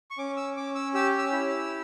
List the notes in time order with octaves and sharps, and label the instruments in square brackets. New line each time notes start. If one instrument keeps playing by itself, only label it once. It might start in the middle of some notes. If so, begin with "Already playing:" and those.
[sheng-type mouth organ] C#6
C#4 D6
E6
C#4 D6
E6
G4 E6
E6
E4